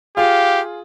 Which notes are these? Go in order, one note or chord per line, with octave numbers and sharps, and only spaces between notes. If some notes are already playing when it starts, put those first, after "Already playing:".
F4 G4 G#4 F5